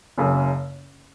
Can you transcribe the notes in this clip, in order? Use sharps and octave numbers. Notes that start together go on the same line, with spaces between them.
F#1 F#2 C#3